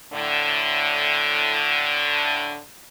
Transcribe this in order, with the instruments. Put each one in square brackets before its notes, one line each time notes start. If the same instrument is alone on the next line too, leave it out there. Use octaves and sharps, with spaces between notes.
[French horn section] A2 D3